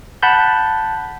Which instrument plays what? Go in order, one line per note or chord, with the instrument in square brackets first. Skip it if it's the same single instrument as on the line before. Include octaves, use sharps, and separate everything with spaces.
[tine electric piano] F#5 A5 B5 G6